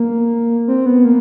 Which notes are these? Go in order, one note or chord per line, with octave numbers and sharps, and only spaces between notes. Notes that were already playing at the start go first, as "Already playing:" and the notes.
Already playing: A#3
C4
B3
A#3